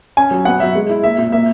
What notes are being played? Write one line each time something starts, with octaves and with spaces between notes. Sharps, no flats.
C#4 G#5
F#3
B3 F#5
F#3 E5
G#3
E4
A#3 E5
A#2 E5
A#3 E5